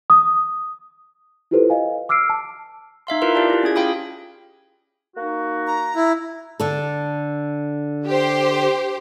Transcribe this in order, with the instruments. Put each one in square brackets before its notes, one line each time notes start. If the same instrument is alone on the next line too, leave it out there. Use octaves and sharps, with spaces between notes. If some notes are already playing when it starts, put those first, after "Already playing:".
[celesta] D#6
E4 F4 G4 A4 B4 C5
D#5 F5 G#5
D6 E6 F6 C7 D7
A5
[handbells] D#4 E5 F5 C6
E4 F4 A#4 B4 C6
F4 G4 D5 A5
E4 G4
C#4 F4 G#4 G#6
F4 F5 G5 B5 D#6
[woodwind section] A#3 D#4 F#4
[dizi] A#5
[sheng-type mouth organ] E4
[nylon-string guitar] D3 A4
[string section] G4 C5